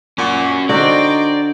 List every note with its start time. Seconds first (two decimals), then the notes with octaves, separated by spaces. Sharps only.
0.18 A#2 C#4 F#4
0.69 D3 D#4 F#4 C5 D5 G5